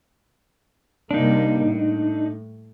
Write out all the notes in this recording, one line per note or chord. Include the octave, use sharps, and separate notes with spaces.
C3 G3 A#3 D4 D#4
A2